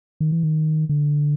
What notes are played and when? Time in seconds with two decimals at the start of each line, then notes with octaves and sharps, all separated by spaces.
0.20 D#3
0.32 E3
0.43 D#3
0.89 D3